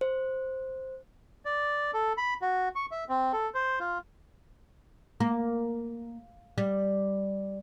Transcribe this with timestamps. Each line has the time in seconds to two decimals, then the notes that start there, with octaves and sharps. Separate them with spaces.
0.01 C5
1.45 D5
1.94 A4
2.17 B5
2.42 F#4
2.75 C#6
2.91 E5
3.09 C4
3.33 A4
3.54 C5
3.80 F4
5.20 A#3
6.58 G3